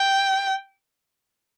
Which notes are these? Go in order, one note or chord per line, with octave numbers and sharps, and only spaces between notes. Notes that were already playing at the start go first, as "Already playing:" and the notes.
Already playing: G5